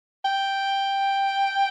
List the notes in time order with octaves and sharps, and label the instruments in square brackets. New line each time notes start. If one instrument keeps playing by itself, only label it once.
[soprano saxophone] G5